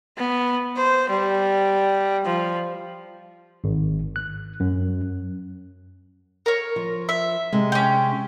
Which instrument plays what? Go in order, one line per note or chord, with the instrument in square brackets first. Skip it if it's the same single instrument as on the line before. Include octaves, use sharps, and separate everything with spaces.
[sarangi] B3
C5
G3
F3
[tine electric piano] G#1
F#6
F#2
[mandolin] A#4 C#5
[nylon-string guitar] F3
[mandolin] E5
[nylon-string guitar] C3 G#3
[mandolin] C#4 G5